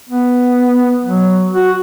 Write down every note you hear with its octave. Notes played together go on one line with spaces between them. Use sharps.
B3
F#3
F#4